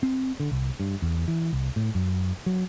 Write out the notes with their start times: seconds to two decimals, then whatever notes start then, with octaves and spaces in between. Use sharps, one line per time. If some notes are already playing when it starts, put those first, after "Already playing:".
0.03 C4
0.40 D3
0.52 C2
0.80 G2
1.02 E2
1.28 E3
1.53 C2
1.76 A2
1.95 F#2
2.46 F#3